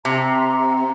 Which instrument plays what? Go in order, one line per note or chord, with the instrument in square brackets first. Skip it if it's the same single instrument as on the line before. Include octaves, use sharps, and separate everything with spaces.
[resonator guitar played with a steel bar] C3 [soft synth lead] C4 [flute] A#5